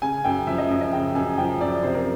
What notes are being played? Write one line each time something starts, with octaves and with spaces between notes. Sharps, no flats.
C#3 G#5
F#2 G5
F3 E5
D#5
F#2
D#5
C#3 G5
F#2 G#5
F3 G5
F#2 D5
C3 C5
A#4